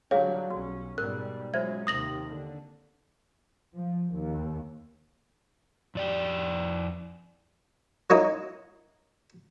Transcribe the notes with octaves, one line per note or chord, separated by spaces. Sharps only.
D3 F#3 G3 E4 G#4 C#5 F5
B1 C#4 F#4
G#2 B2 G3 A#4 F#6
F#3 G#3 C#4 F4 C5 E5 G#6
D#2 C3 D#3 D#6 A#6 F#7
D3
F3
D#2
F2 D5 G5
F#3 A#3 C#4 D#4 E4 D#5